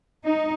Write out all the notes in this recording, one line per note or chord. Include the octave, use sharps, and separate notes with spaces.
D#4